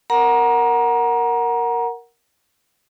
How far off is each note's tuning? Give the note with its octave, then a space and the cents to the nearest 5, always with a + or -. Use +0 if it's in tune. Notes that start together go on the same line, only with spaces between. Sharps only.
A#4 +0 F#5 +0 A#5 +25